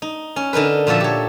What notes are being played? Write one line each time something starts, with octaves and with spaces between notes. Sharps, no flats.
D#4
C#4
D3 D#4 A#4 B4
A#2 F3 F#4 A4 E5
G4 C#5